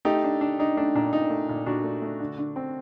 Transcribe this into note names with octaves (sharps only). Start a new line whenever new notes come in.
A3 D#4 G4
D4
D4
D4 D#4
A3 D4
A#2 D4
A#2 D#4
A3
A#2
A#2 D4 F#4
A3
A3
D3
D3
C4